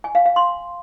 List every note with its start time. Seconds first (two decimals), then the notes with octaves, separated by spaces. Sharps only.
0.04 G#5
0.15 F5
0.26 F5
0.36 C6